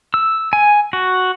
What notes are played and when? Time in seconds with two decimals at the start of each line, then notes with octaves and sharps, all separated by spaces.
0.14 E6
0.53 G#5
0.93 F#4